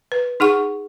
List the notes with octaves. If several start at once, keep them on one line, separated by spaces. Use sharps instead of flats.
B4
D#4 G#4 F#5 C#6